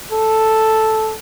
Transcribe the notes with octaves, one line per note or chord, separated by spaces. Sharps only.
A4